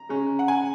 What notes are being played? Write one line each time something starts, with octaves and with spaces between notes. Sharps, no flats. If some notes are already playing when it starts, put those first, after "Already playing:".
Already playing: A#5
C#3 G#3 C#4
F#5
G#5